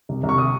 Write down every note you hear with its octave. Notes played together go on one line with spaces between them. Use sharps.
C2
C2
C#6
D#6